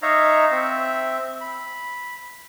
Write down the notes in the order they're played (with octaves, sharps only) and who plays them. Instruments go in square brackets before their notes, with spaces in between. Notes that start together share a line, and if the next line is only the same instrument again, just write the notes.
[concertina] D#4 C#5 E5 F5 A#5
C4 E5
B5